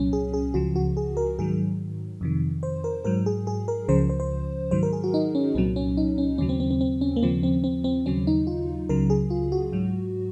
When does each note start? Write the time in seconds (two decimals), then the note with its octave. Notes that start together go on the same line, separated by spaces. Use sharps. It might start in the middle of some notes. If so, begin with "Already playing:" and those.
Already playing: C2 A#2 F#3 C#4
0.13 G#4
0.34 G#4
0.54 C#2 C#3 F3 F#4
0.76 F#4
0.97 G#4
1.17 A#4
1.39 G#2 D#3 F#3 G#4
2.21 F2 C3 D#3
2.63 C5
2.84 A#4
3.05 G#2 F#3 A#4
3.26 G#4
3.47 G#4
3.68 A#4
3.88 C#2 C#3 F3 C5
4.09 C5
4.20 C5
4.71 G#2 D#3 F#3 C5
4.83 A#4
4.93 G#4
5.04 F#4
5.14 D#4
5.35 C#4
5.55 C2 A#2 F#3 C4
5.76 C#4
5.97 D#4
6.18 C#4
6.38 D#2 C#3 F#3 C#4
6.49 C4
6.60 C4
6.70 C4
6.81 C4
7.01 C#4
7.16 A#3
7.22 D#2 C#3 F3 C4
7.43 C4
7.64 C4
7.84 C4
8.06 D#2 C#3 F#3 C#4
8.27 D#4
8.47 F4
8.89 C#2 C#3 F#3 A#4
9.10 G#4
9.30 F4
9.52 F#4
9.72 G#2 F#3